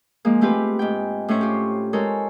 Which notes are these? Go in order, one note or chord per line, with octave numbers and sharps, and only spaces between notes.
F3 G#3 A#3
A3 C4 F4 G4 B4
G#2 G5
A2 A3 C#4 E4 C5 C#6
F4 G4
G#3 A4 A#4 C5 C#5